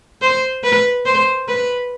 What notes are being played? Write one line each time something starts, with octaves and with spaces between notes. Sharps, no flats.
C5
B4
C5
B4